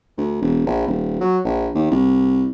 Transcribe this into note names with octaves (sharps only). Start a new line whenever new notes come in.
D2
E1
A#1
D#1
F#3
A#1
D#2
C2